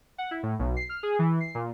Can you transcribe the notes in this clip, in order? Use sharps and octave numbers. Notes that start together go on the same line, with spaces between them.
F#5
E4
A2
B1
C7
F6
G#4
E3
C7
A#2